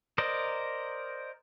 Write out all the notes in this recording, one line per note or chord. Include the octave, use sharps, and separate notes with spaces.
A#4 C5 D5 D#5